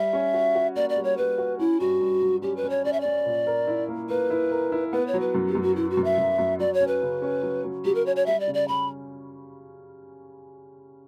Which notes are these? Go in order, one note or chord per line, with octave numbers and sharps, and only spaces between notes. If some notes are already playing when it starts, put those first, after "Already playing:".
Already playing: G3 E5
C#4
F#4
F#4
A#3 D5
D5
G3
C#5
G3 B4
F#4
C#4 E4
G2 F#4
G2
F#3
C#4 G4
B4
C#4
C#5
C#4 D5
E5
C#4 D5
A#2
A#4
E4
A#3
A#3 B4
E4
A#4
E4
B3 B4
C#5
F#3
B4
F#2
G4
F#2
F#4
F#3 E4
F#4
F#2
E5
F#2
F#2
F#3 D5
C#5
C#4
B4
C#3
C#4
F#3
F#3
F#3 G4
A#4
C#4 C#5
C#5
G3 E5
D5
C#3
D5
C#4 B5